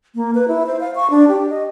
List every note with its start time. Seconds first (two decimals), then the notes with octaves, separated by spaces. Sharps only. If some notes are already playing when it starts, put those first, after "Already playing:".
0.15 A#3
0.35 B4
0.48 E4
0.67 C5
0.80 F5
0.95 C#6
1.10 D4
1.28 G4
1.50 D#5